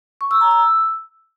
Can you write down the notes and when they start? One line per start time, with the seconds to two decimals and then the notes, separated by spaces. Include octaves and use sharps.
0.21 C#6
0.31 E6
0.41 A#5
0.51 E6
0.61 E6